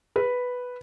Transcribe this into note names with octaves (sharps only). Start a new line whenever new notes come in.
B4